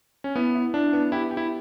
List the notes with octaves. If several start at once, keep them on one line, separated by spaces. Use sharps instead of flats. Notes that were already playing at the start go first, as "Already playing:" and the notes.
C#4
B3 E4
E4
D4 E4
B3
E4 G4
G4
E4